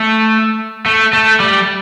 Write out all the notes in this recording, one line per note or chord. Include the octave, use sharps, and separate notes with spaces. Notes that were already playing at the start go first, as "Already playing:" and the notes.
Already playing: A3
A3
A3
G3